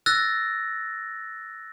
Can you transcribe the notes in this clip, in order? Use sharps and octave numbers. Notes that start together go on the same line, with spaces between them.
E6 F#6 A6 A#6